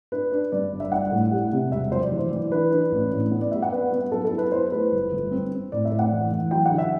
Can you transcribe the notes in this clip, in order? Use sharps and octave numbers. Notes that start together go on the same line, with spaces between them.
D4 B4
D4
G2 D5
G1
E5
D4 F#5
A2
G3
C3
E1 E5
F#3 C5
D5
E3
E3
D4 B4
D4
A1
A2
B3
D5
G3 E5
F#5
B3 B4
B3
F#3 A4
A4
E4
B4
E4 C5
A3 B4
G1
G1
C4
C4
A2 D5
E5
A2
F#5
E3
E3
F#3 G5
F#5
D3
E5